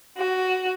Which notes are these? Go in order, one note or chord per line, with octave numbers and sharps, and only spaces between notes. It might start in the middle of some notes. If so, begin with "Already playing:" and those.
F#4